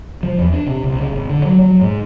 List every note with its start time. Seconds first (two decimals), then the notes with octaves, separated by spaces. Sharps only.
0.23 F3
0.39 E2
0.53 D4
0.67 C3
0.84 C2
0.99 C#3
1.14 G#1
1.30 D3
1.45 F#3
1.61 F#3
1.81 G#2